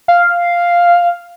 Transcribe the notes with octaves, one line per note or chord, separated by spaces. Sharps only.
F5